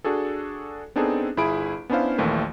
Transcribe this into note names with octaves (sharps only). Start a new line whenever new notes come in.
D4 F#4 G#4 A4
B3 C4 D4 D#4 G#4 A4
G1 E4 F4 G#4 B5 D7
B3 C#4 D4 E4 C5 F5
A#1 D#2 D#3 E3 A3